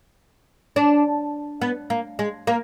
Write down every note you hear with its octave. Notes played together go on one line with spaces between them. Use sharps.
D4
B3
A#3
G#3
A#3